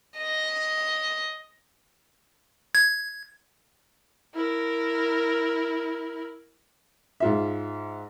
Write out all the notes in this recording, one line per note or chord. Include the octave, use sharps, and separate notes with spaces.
D#5
G#6
E4 A#4
G#2 F4 E5